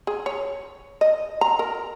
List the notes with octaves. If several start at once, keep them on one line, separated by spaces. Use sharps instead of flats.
G#4
C#5
D#5
A#5
A#4